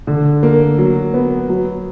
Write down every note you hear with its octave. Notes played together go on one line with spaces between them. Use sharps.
D3
A#3
F#3
B3
F#3